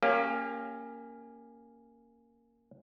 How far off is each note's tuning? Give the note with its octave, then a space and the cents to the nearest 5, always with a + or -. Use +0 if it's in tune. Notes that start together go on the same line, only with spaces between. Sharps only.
A#3 -5 C#4 +0 G4 +30